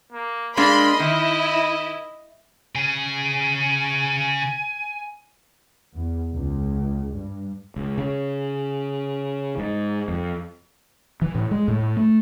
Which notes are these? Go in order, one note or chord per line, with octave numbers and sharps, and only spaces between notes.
A#3
G#3 A#3 D4 D#5 B5 C6
D#3 E4
C#3 G#4 G#5
E2
C#2
G2
C#2
C#3
G#2
F2
E3
A2
G#3
A2
A3